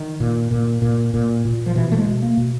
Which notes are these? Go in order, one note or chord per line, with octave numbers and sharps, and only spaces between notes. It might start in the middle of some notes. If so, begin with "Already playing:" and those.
Already playing: D#3
A#2
A#2
A#2
A#2
A#2
F3
B2 E3
A3
G#3
B2
A#3
B2